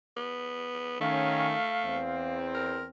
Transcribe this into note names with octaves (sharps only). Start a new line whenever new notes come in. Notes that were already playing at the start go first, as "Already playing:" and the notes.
B3
D#3 A3 C#4 F5
E2 C4
A#4